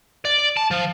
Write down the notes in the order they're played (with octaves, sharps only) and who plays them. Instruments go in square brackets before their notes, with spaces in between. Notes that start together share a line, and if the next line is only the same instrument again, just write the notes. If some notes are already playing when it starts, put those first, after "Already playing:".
[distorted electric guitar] D5
A5
F3